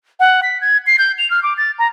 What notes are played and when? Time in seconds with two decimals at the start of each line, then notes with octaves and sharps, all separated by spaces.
0.20 F#5
0.43 B6
0.61 G#6
0.87 C7
0.98 G6
1.18 F7
1.30 F6
1.43 D6
1.57 A6
1.79 A#5